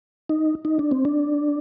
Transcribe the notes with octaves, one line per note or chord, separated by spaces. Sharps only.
D#4
D#4
D4
C4
D4